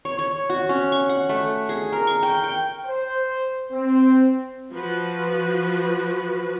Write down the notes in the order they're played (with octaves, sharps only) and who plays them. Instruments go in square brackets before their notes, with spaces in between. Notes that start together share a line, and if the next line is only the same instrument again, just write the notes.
[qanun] C#5
C#5
F#4
C#4
C#6
F#5
A3
G#4
A#4
C#6
G5
G5
[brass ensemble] C5
C4
[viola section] F3 F#4 B4